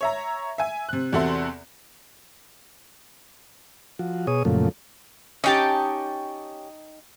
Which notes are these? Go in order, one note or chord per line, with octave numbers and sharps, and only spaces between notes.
C#5 E5 A#5
E5 G#5
C3 F#6
E2 C3 F#4 A4 E5 C6
F3 F#4
B2 G#4 C#5 D#6
F#2 A#2 C#3 F3 A3
C#4 D#4 G4 G5 A5